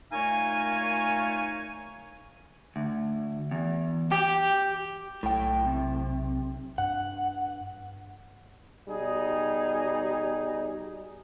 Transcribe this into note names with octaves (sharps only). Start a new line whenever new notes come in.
A#2 A3 D#4 C#5 F5 G#5
D2
E2
G4
B1 A2 G5
C3
G2 F#5
B2 G3 D#4 G#4